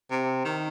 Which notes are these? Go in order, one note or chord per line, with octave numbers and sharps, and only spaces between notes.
C3
D#3